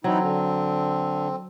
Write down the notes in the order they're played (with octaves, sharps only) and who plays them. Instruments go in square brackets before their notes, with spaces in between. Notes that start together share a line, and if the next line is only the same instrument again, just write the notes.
[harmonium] E3 D#4 E4 [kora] F#3 [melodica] C4
[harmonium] D3